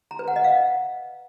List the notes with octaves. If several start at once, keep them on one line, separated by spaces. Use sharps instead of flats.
A#5
B4
F#5
D#5
F5